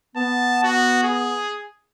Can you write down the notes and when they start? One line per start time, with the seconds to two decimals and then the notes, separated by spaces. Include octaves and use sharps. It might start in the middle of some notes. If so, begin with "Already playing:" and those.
0.16 B3 A5
0.64 F#4
1.03 G#4